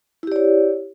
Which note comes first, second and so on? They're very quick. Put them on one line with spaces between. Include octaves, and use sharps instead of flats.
E4 G4 D5 C#5